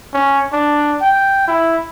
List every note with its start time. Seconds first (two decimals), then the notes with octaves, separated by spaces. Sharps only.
0.14 C#4
0.53 D4
1.01 G5
1.47 E4